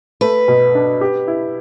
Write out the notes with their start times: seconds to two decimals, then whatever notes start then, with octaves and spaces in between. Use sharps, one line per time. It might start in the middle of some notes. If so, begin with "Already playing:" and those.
0.21 A3 B4
0.48 B2
0.75 D4
1.01 G4
1.27 E4